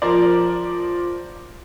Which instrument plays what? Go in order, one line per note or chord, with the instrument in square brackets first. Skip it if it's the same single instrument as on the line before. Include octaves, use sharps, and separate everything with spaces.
[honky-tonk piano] F3 A#4 C5 D5